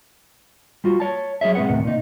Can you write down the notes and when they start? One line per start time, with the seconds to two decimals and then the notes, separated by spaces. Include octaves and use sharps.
0.84 G3 F4 F#4
1.00 C#5 A5
1.41 F#3 G#4 C#5 E5
1.55 B2 G#3 C4 B4 F#5
1.69 D#2 A2 C3
1.84 A#2 D#4